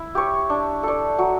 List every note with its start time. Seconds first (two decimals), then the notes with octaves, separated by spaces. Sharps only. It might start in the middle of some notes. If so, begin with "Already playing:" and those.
Already playing: E4
0.15 G4 C#5
0.50 D4
0.83 A4 D5
1.18 F#3